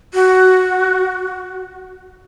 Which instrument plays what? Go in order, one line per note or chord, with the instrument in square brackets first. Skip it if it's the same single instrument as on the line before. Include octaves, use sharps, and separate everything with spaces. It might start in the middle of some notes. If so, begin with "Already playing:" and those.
[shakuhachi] F#4